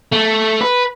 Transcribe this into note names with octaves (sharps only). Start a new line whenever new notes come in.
A3
B4